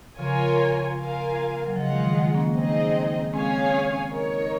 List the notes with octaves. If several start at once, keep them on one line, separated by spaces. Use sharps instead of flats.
C#3 F3 F4 A#4 C#5 G#5
A#3 F4 A#4 F5 G#5
F#3
C#3 F3 F4 G#4 D#5 F#5
G#3
D#3 F#3
F3 G#3
A#3 C#4
C4 D#4 G#4 D#5
G#3 C4 C#4 G#4 C#5 F5 G#5
D#4 A#4 C#5